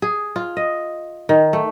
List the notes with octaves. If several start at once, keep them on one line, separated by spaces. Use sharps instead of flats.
G#4
F4
D#5
D#3
A3